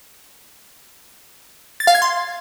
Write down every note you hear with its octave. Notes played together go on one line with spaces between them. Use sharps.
A6
F5
G#6
C6